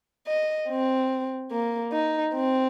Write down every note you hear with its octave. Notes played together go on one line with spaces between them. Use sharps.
D#5
C4
A#3
D#4
C4